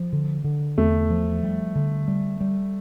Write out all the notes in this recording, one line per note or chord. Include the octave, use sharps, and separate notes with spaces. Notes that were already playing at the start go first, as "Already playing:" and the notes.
Already playing: F3
D3
D3
E2 A3
F3
G3
D3
G3
G3